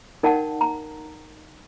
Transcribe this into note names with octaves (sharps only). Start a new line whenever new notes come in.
D#4 A#4 D5 F#5 G5 A5
A#5